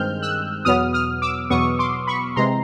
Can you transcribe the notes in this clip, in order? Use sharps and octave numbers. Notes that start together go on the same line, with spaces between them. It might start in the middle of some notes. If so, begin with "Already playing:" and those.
Already playing: G2 D#3 G#3 C4 F6 G6
E6 F#6
E2 B2 F#3 B3 D#6 F6
D#6 F6
D6 E6
E2 B2 F#3 B3 C#6 D#6
C6 D6
B5 C#6
C3 E3 G#3 C4 A#5 C6